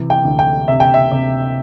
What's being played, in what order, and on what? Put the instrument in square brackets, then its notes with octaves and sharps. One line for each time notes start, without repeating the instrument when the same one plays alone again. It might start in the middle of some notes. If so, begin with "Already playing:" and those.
Already playing: [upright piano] C3 E3
G5
D2
G5
C3 E5
G5
E5
C3